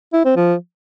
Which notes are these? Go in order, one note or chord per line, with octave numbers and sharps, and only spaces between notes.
E4
C4
F3